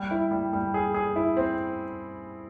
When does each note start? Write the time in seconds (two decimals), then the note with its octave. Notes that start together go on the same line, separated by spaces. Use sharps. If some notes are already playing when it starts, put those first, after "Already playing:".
Already playing: G3
0.11 E4
0.31 G3
0.53 G3
0.74 G#4
0.94 G#4
1.16 E4
1.37 C4